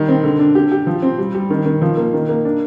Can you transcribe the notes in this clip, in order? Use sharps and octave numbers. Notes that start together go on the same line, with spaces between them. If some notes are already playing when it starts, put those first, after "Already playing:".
Already playing: D#3 G3
C4
D3
D4
G4
G4
F3
C4
G3
G3
D#3
D#3
F3
A#3
D#3
A#3
D4